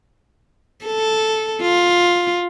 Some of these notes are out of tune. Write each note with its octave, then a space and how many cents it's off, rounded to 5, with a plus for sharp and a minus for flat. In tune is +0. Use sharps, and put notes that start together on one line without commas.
A4 -5
F4 +10